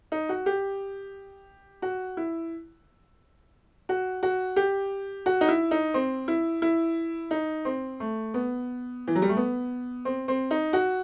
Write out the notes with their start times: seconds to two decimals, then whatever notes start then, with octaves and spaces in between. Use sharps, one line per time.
0.12 D#4
0.29 F#4
0.46 G4
1.82 F#4
2.17 E4
3.89 F#4
4.23 F#4
4.56 G4
5.26 F#4
5.41 D#4
5.48 E4
5.71 D#4
5.94 C4
6.28 E4
6.62 E4
7.31 D#4
7.65 C4
8.00 A3
8.34 B3
9.08 E3
9.15 F#3
9.22 G3
9.29 A3
9.37 B3
10.05 C4
10.28 C4
10.51 D#4
10.73 F#4